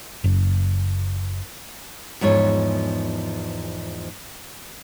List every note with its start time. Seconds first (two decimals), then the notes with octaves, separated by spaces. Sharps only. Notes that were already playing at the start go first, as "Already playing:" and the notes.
0.24 F#1
2.21 E2 G#2 F3 C#5